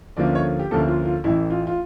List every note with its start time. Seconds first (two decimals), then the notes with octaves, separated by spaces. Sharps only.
0.17 D2 D3 F3 A#3 C#4 D5
0.35 C#5
0.59 G4
0.71 D2 D3 F3 A#3 C#4 A4
0.88 F4
1.06 F4
1.24 A1 A2 E3 E4
1.50 F4
1.67 F4